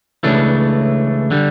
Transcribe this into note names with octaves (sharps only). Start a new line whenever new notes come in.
C#2 C#3 E3 A3 D4
D3 G3